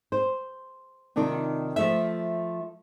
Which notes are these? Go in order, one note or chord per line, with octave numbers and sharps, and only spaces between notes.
C5
C3 D#3 D4 D#4 F4
F3 A3 E5